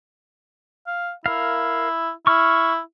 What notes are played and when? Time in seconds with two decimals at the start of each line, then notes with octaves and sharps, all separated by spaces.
0.87 F5
1.26 E4 A#4 F5
2.27 E4 C#6 F6